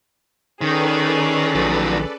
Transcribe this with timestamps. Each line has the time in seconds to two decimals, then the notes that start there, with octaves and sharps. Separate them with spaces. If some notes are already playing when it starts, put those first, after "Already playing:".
0.61 D#3 C#4 G#4 A4 B4 D5
1.55 A#1 D#3 F#3